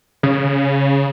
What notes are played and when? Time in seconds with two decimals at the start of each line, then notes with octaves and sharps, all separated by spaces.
0.23 C#3